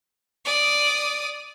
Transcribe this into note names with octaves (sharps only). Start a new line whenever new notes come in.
D5 D#6